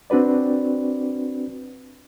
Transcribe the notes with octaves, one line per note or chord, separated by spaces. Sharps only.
C4 D4 F#4 B4 D5